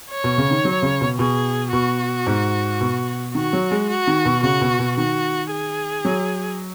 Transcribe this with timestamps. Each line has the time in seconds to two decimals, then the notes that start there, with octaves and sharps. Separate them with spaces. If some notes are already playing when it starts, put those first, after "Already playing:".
0.11 C#5
0.24 B2
0.38 C#3
0.51 D#3
0.65 F#3
0.82 C#3
1.01 B2
1.19 B2 G#4
1.72 B2 F#4
2.27 G#2
2.81 B2
3.35 D#3 F#4
3.53 F#3
3.71 G#3
3.90 F#4
4.07 D#3
4.25 B2
4.43 C#3 F#4
4.61 B2
4.79 B2
4.97 D#3 F#4
5.51 G#4
6.05 F#3